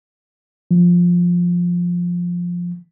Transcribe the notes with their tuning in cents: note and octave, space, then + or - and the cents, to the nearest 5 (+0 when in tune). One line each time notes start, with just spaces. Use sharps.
F3 +5